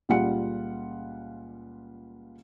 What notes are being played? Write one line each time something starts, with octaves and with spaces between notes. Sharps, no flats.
C#2 A#2 G3 F4 F#5 C#7